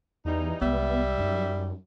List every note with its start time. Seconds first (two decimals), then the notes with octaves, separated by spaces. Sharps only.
0.25 E2 E3 G3 D#4
0.61 C2 G3 G#3 B3 E5
1.18 F#2 D#4